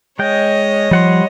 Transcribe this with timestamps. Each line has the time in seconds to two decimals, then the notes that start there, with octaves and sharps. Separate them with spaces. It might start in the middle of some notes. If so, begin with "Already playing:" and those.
0.19 G#3 C#5 D#5 G5
0.91 F3 G3 F#5 C6